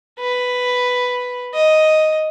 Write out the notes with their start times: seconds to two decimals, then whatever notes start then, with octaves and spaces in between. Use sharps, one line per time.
0.20 B4
1.54 D#5